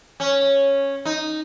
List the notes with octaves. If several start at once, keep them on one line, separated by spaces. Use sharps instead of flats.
C#4
D#4